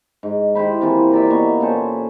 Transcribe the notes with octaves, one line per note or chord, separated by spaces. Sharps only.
G#2
E4 G4 C5 B5
C3 E3 A#3 F4
A#4 D5 E5
B2 A#3 B3 C#6
A#2 C#4 A4 C5